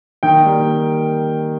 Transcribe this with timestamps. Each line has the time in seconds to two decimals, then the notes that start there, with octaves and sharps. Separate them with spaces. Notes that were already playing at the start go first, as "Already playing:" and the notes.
0.23 D#3 G5
0.41 G3 A#3
0.59 D#3